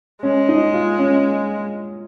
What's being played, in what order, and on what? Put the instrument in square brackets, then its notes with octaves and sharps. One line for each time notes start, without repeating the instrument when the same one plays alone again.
[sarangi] G#3 [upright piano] C#4
[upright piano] D#4
F4
C#4